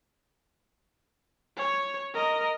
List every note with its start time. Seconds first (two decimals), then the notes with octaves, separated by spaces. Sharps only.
1.57 C#5
2.14 A#4 D#5